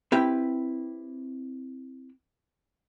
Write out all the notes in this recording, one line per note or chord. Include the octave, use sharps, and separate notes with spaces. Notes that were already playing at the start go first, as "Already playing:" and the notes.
C4 E4 G4 B4 G5